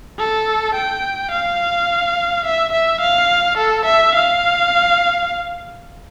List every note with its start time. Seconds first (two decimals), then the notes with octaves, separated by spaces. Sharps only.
0.19 A4
0.75 G5
1.32 F5
2.45 E5
2.73 E5
3.01 F5
3.58 A4
3.86 E5
4.15 F5